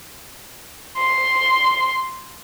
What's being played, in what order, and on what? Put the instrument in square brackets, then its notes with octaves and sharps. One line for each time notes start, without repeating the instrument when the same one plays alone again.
[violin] C6